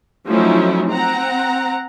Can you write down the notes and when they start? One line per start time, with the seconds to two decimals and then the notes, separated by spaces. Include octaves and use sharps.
0.26 F3 F#3 A3 C#4 D#4 E4
0.89 C4 F#5 A#5